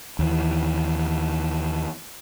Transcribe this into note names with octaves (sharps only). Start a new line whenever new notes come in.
D#2 E3